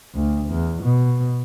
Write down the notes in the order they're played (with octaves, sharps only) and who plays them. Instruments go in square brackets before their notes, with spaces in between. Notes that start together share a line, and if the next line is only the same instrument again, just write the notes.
[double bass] D2
E2
B2